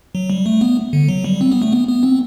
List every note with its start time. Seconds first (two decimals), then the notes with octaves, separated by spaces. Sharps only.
0.15 F#3
0.30 G3
0.46 A3
0.61 B3
0.93 D3
1.08 F#3
1.25 G3
1.41 C4
1.52 B3
1.62 A3
1.72 B3
1.88 B3
2.03 C4